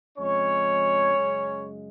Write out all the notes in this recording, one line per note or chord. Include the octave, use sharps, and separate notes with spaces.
F2 C#3 G#3 C#4 C#5
F#2 C#3 G#3